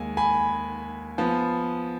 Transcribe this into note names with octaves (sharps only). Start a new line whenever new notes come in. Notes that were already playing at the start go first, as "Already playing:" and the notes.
Already playing: D#2 G#3 G#5
G#5 B5
F3 B3